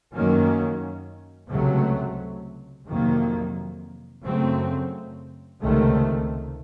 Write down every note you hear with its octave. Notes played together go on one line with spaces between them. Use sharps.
F#2 D#3 F#3 A#3 C#4
C#2 C3 F#3 A3
F2 C3 D#3 F#3 A#3
F#2 C#3 F#3 A3 C4
C#2 C3 D#3 A3